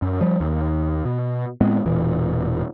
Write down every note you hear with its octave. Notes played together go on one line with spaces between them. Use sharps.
F#2
F3 G3
D#2
B2
A2 G#3 B3 C4
E1 A#2 E3